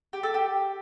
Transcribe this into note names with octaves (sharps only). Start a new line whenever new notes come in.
G4
A4
G4